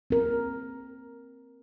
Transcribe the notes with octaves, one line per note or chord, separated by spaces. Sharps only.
C4 A#4